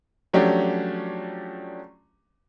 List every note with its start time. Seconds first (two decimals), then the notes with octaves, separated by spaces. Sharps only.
0.33 F3 F#3 A3 C#4 D4 G4